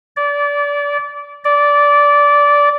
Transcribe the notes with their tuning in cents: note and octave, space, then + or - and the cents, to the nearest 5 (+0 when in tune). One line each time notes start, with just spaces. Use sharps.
D5 -25
D5 -15